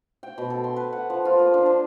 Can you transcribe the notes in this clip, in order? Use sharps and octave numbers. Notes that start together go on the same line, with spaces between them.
G5
B2
A4
C6
B4
F#5
F3
F4
A#3
D4
C5